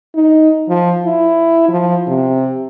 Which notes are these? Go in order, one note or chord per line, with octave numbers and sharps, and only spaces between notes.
D#4
F3
E4
F3
C3